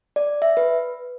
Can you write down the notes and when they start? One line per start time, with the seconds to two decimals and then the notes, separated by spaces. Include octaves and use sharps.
0.16 D5
0.42 E5
0.57 B4